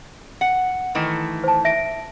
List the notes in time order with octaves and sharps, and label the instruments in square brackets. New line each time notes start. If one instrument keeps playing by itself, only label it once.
[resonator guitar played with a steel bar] F#5
D#3 E3 A3
[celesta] C5 A5
E5 A#6 D7